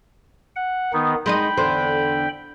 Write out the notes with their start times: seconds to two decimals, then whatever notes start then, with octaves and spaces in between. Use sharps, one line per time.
0.56 F#5
0.93 D#3 B3 D#4
1.26 G#3 D#4 D#5 G5 B5
1.57 E2 D3 C5